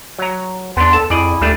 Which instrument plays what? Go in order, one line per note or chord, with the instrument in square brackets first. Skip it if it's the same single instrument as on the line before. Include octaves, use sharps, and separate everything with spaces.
[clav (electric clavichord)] F#3 A#5
[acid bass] E2 [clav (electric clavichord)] B3 D4 [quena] C6
[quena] A4 [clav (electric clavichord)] A5
[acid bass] F2 [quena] E4 [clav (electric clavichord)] G#4 D5 D#5
[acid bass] D2 [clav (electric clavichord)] G3 A3 D4